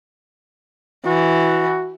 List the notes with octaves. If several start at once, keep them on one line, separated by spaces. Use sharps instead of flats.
E3 F#4